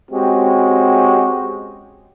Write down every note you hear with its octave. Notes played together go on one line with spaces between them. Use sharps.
G#3 C4 C#4 F#4 G4